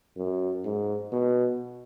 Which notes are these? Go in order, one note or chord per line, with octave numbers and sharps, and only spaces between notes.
F#2
G#2
B2